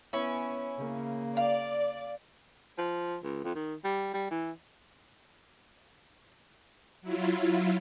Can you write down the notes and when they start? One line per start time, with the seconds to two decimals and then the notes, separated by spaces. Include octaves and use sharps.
0.13 B3 C#4 E4
0.76 C#3 A#3
1.37 D5 F5
2.78 F3
3.24 C#2
3.44 F2
3.55 D#3
3.84 G3
4.14 G3
4.31 E3
7.02 F#3 E4 F4